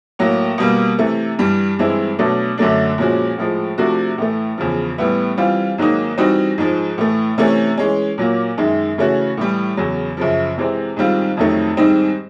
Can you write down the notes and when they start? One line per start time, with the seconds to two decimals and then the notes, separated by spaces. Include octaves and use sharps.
0.19 A2 F#3 A#3
0.58 B2 G3 A#3
0.98 C3 E3 A3
1.39 G2 E3 G3
1.79 G2 E3 G#3 C4 E4
2.19 B2 F#3 A3 D4
2.58 F#2 D3 F#3 A3 D4
2.98 A#2 F3 G#3 C#4 F#4
3.38 A2 F3 G#3
3.78 C3 F3 A3 D4 F#4
4.18 A2 E3 A3
4.58 E2 C#3 F3
4.98 A2 E3 G3 B3 E4
5.37 E3 G3 C4 F4
5.78 G#2 D#3 F#3 A#3 D#4
6.18 E3 G3 C4 D#4 F#4
6.58 G#2 F3 G#3
6.98 A2 E3 A3
7.38 C3 E3 A3 C#4
7.78 E3 G#3 C#4
8.18 A#2 F#3 A#3
8.58 F#2 D#3 G#3
8.98 C#3 E3 A3 C#4 F#4
9.37 A2 E3 G3
9.77 E2 C#3 F#3
10.17 F#2 C#3 F3
10.57 C3 E3 G#3 C4
10.97 G#2 D#3 G3 C4 F4
11.37 F2 C3 D#3 F#3 A3
11.77 G#2 D#3 G3 C4 D#4